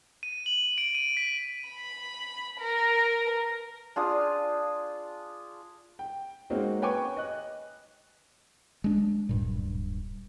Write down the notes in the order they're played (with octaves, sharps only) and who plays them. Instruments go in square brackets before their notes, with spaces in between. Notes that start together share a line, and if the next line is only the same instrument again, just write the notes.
[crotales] D#7
F#7
D7
D#7
B6
[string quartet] B5
A#4
[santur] D4 F4 G#4 D#6
[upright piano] G5
G#3 A#3 C4 C#4 D#4 F#4
B4 C#5 G5 G#5 C#6 D6
D#5 F#6
[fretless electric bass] G#3 D4
D1 G2 A#2